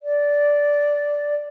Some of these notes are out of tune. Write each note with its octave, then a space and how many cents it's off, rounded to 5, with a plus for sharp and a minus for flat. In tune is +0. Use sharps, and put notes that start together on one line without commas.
D5 -10